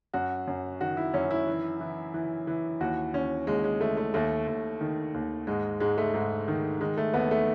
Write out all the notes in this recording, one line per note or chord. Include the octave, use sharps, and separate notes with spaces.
F#2 F#4
F#2
D#3 F#4
E4
F#2 C#4
E4
E3
E3
E3
E3
D#2 F#4
D#2 C#4
D#2 G#3
G#3
D#2 A3
A3
D#2 A3
D#2
D#3
D#2
G#2 G#3
G#2 G#3
A3
G#2
D#3
D#3 G#3
A3
D#2 B3
A3